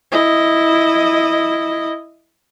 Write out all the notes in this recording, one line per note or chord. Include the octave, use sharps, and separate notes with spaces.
E4 D#5